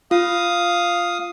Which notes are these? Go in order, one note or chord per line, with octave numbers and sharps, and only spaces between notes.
F4 F5 D#6